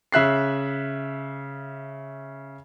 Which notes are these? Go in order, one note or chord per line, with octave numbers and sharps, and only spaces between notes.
C#3 E5 F#6 C7